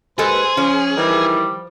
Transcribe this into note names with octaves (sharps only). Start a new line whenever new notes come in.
D#2 G#3 G#4 A4 B4 C5 G#5
F3 C#4
D#3 E3 G3